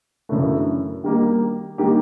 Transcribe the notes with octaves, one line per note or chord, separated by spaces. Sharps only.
F#2 C#3 E3 A3 D4
D#3 G3 A#3 D#4 G4
D#3 G3 A#3 D#4 G4